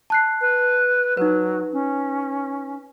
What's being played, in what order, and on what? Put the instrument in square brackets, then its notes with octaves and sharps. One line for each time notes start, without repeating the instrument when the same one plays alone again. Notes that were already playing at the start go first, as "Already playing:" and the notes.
[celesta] A5 F#6 C7
[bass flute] B4
[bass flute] F#3 [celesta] D#4 B4
[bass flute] C#4